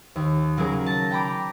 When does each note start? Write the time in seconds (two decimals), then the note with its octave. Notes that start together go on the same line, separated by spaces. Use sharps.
0.16 D#2
0.57 C#3 F#3 C#4 G#4 A#4
0.86 A5 A#6
1.11 G5 A#5 B5 D6